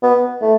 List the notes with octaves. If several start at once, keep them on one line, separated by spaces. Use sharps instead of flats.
B3
A3